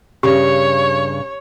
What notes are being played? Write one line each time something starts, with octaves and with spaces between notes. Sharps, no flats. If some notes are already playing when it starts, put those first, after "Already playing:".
G2 C#3 G4 C#5